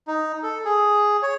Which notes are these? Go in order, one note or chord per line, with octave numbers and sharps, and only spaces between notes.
D#4
A4
G#4
C#5